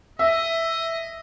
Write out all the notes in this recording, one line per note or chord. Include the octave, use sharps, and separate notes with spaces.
D#5 E5